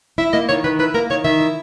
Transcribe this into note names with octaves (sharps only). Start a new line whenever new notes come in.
E4 E5
A#3 D#5
D#3 C#5
D#3 B4
E4 B4
A#3 A#4
D#3 C#5
D#3 E5
E4